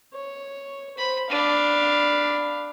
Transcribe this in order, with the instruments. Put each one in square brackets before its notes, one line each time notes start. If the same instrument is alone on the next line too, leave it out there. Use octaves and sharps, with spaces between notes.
[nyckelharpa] C#5
[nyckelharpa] C5 [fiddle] B5
[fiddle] D4 [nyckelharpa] F5 B5